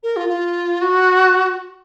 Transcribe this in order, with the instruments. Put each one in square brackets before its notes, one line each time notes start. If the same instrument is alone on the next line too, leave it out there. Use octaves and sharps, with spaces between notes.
[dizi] A#4
F4
F4
F#4